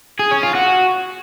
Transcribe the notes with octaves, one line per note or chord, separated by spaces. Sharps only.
G#4
C#4
F4
F#4